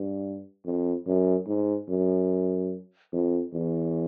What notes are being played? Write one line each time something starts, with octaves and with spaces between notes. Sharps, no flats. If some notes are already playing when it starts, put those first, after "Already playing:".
Already playing: G2
F2
F#2
G#2
F#2
F2
E2